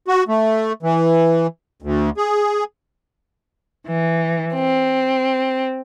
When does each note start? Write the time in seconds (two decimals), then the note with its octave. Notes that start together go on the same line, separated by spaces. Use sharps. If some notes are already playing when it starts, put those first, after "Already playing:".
0.08 F#4
0.28 A3
0.83 E3
1.82 D2
2.17 G#4
3.85 E3
4.55 C4